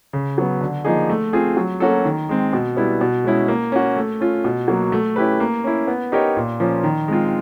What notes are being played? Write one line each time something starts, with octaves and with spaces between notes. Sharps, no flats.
C#3
F#3 B3
D3
F3 A#3 D#4 G#4
A3
C4 F4 G#4
F#3
A#3 C#4 F#4 A4
D#3
G#3 C4
B2
G3 B3 E4
B2
G#3 C#4 E4
A#3
C#4 F#4
A3
C#4 F4
B2
F#3 A#3
A3
C#4 E4 G4 B4
A#3
C#4 E4
B3
D#4 G4 A#4 C#5
A#2
F3 A#3 C#4
D#3
G#3 C4 F4